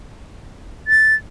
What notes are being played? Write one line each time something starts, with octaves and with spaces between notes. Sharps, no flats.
A6